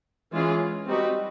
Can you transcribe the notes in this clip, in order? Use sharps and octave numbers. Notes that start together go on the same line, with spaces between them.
E3 G#3 C#4 F4 G#4
G3 C4 D#4 F#4 B4